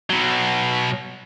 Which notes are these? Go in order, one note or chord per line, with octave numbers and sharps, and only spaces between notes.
B2 F#3